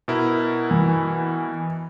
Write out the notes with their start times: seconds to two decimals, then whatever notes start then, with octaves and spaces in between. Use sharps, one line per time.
0.08 B2 E4 A#4
0.71 E3